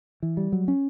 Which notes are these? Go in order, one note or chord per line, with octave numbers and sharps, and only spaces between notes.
E3
G3
F#3
C#4